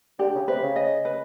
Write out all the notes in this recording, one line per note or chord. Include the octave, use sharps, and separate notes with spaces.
D3 G4
C#3
C3 B4
C#3
D#5
B4